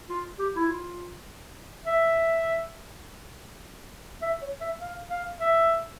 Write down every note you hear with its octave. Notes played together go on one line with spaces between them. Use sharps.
F4
G4
E4
F4
E5
E5
C#5
E5
F5
F5
E5